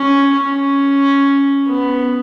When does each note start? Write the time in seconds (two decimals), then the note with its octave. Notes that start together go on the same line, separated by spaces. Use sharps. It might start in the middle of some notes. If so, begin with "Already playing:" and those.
Already playing: C#4
0.33 C#4
1.68 B3